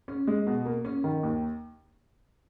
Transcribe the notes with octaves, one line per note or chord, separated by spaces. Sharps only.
C#4
G#3
B2
A#3
C#4
D#3
D#2